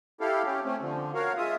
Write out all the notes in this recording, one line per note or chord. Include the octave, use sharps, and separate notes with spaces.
E4 G4 A4 F5
C#4 G4
A3 C4 C#4
D3 F3
F#4 A#4 C#5 F5
G#3 F4 E5 D#6